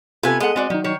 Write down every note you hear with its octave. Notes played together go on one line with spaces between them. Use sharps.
C3 B3 F4 G4 A4 B4 G#5
G#3 G#4 A4 D#5 F#5
G#3 C4 F#4 D5
D#3 F#3 D#4
D#3 C#5